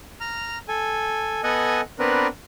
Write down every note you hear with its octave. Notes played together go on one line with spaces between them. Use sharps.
A#5 F6
A4 G#5
B3 A4 D#5 F#5 G#5
B3 C4 D4 A#4 B4